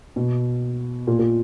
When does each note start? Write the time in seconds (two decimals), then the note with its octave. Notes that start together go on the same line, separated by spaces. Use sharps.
0.16 B2
1.07 A#2
1.19 A#2